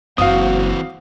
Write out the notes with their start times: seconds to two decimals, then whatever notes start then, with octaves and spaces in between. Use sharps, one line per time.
0.18 F#1 E3 C4 F#4 F5 D#6